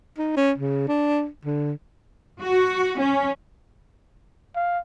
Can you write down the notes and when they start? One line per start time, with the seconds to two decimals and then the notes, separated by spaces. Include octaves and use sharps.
0.18 D#4
0.37 C#4
0.58 C#3
0.88 D4
1.45 D3
2.40 F#4
2.98 C#4
4.55 F5